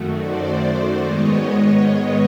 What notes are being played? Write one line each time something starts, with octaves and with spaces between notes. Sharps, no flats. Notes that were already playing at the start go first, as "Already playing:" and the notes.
Already playing: F#2 D#3 F#3 A3
C5 D5
G#2 D#3 G#3 B3 C#5 D#5